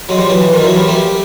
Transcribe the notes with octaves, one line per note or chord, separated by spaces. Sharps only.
F#3 G#3
F3 G3
E3 F#3
E3
D#3 F3
E3 F#3
F3 G3
G3 A3